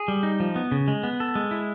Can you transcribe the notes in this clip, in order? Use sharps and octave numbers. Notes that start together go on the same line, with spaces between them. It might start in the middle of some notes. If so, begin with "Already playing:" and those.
Already playing: G#4
G3
D#4
F3
B3
C#3
G#3
B3
A4
G#3
E4